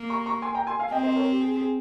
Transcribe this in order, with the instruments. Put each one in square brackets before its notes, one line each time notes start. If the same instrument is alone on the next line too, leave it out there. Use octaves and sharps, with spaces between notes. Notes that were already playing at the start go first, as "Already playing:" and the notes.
Already playing: [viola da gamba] A#3
[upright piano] A#5 C#6
A#5 C#6
G#5 C6
G5 A#5
G#5 C6
F5 G#5
[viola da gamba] C4 [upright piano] D#5 G5
[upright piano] C5 D#5
A#4 C#5
G4
G#4
G#4